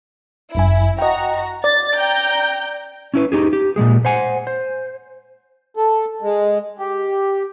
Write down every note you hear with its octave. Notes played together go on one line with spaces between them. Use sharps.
G1 F#2 E4 G#5
F#4 D#5 G5 A#5
D5 A6
G5 A#5 G6
C#4 E4 B4
D#4 G4 G#4
G4
A#2 F3 G#3 G#4
C5 F#5 G#5
C5
A4
G#3
G4